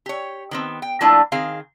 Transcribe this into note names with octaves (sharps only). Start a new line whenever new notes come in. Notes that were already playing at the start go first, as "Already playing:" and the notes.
G4 C#5
D#3 B3 C4
G5
F3 A3 A#3 D4 E4 F4
D#3 C4 G#4 F5